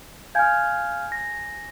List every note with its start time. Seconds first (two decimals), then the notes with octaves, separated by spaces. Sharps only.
0.35 F5 G#5 F6 G6 G#6
1.12 A#6